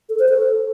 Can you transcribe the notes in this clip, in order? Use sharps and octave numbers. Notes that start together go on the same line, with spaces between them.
A4
C5
A4